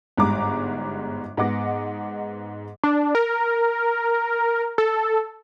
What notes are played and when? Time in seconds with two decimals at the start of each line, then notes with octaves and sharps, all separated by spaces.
0.17 G1 G#2 G3 A#5 D6
1.37 G#2 B3 D#5 F#5 D6 A#6
2.83 D4
3.15 A#4
4.78 A4